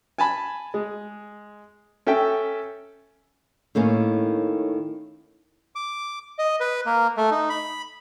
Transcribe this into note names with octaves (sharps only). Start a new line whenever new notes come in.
G#5 A5 B5
G#3
C#4 A4 E5 G5
A2 D#3 A#3 C#4
D6
D#5
B4
A#3
A3
D#4
B5